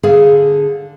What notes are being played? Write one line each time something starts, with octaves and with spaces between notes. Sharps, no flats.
D3 G#4 D5 F5